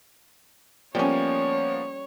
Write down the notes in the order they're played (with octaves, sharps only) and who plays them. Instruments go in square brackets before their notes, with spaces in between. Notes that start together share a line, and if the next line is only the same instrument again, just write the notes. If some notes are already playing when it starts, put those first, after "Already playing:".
[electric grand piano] F3 A#3 B3 [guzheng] G3 C#4 [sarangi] C#5